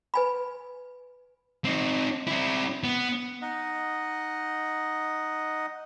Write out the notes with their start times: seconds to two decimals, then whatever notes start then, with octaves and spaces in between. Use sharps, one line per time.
0.14 B4 G#5 B5
1.64 C4 D#4
2.27 C4 E4
2.83 B3
3.42 D#4 D#5 F#5